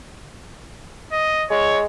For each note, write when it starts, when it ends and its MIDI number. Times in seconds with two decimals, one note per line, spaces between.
1.12 1.44 75
1.50 1.85 56
1.50 1.80 73